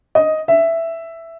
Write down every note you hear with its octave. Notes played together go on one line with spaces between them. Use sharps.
D#5
E5